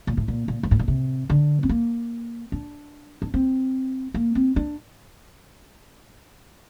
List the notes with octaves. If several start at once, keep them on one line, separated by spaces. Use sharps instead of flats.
A#2
A2
A#2
A#2
G2
A2
A#2
C3
D3
C4
A#3
D4
D4
C4
A#3
C4
D4